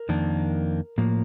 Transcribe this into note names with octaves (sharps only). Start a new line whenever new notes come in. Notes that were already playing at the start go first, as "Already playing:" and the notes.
Already playing: A#4
F2 D#3 A#3 D4
A2 F3 A#3